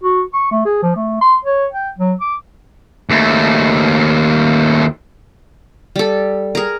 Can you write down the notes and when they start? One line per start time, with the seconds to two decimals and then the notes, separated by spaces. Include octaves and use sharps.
0.03 F#4
0.33 C#6
0.51 A3
0.65 G#4
0.82 F3
0.95 A3
1.21 C6
1.45 C#5
1.72 G5
1.98 F#3
2.20 D6
3.10 D#2 A3
5.96 G3 A4
6.55 G#4 A#4